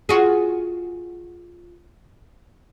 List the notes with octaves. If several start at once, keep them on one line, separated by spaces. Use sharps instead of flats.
F4 F#4 G#4